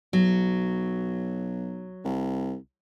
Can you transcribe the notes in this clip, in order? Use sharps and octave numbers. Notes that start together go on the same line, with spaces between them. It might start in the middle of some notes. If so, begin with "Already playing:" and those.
B1 F#3
C2